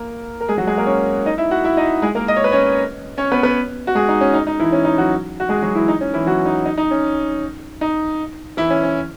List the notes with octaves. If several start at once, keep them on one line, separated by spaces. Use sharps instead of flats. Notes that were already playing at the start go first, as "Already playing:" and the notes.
Already playing: A#3 A#4
A#4
G#3 G#4
F#3 F#4
G#3 G#4
A#3 A#4
C#4 C#5
D#4 D#5
E4 E5
F#4 F#5
E4 E5
D#4 D#5
G#3 G#4
A#3 A#4
D#5
C#5
B4
C#4 C#5
C#4 C#5
B3 B4
B3 B4
F#4
G#3 G#4
D#4
C#4
D#4
D#4
E3 E4
C#4
D#4
F#3 F#4
F#4
G#3 G#4
F#3 F#4
E3 E4
D#4
C#4
E3 E4
F#3 F#4
D#4
D#4
D#4
C#4
D#4
E3 E4
C#4
C#4